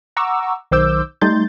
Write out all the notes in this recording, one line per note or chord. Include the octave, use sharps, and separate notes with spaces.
F#5 A#5 C#6 D6 E6
B1 D#3 C5 D6 E6 G6
G3 A3 D#4 C6 G6 A6